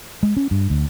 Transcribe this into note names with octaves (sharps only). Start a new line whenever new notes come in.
G#3
C#4
G2
D2